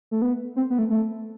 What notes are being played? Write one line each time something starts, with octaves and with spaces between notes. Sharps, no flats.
A3
B3
C4
B3
A3
A3